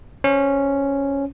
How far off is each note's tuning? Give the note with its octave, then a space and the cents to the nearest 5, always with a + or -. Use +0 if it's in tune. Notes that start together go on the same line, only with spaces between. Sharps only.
C#4 +0 C5 +0